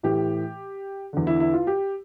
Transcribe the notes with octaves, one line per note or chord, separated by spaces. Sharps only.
A2 E3 G4
E2 D3
E4
E4
F4
G4